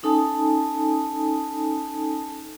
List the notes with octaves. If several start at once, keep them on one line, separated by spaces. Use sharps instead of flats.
C#4 D#4 A4 G#5 A5 D#6